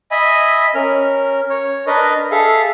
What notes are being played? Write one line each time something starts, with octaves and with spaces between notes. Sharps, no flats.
D#5 E5 G#5 B5
C#4 A#4 F6
C#5
D4 A#4 B4 D#5
G#4 A4 E5 F5